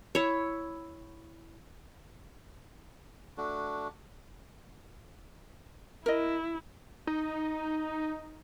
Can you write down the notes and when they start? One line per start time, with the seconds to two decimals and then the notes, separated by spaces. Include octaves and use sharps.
0.15 E4 C#5
3.37 A3 D4 F#4
6.06 E4 A#4 D#5
7.07 D#4